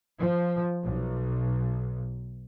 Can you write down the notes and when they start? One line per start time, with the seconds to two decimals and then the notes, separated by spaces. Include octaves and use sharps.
0.18 F3
0.84 B1